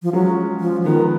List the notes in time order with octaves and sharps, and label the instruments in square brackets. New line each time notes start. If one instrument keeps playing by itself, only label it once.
[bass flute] F3
[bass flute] F#3 [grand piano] G#3 C#4 F4
[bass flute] F3
[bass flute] D#3 [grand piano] F3 G#3 B3